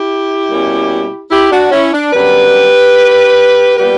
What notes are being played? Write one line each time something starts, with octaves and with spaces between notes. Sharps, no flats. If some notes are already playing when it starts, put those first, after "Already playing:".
Already playing: E4 G4
B2 G3 A#3 C#4
E4 G4
D4 F#4
C#4 E4
D4
F#2 D3 G3 B3 G4 B4
A#2 G3 B3 G4 B4